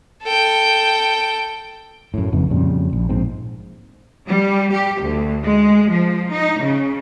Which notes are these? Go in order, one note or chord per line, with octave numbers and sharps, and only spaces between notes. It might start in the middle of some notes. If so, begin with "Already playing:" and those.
A4 G5
F#2 A2
G#1 F2 C#3 B3
F2 A#2 C#3 G3
A#1
A#1 G#2 C4
G3
G4
D2
G#3
F3
D#4
C#3